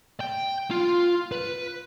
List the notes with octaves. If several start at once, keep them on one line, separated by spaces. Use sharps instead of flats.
G5
F4
B4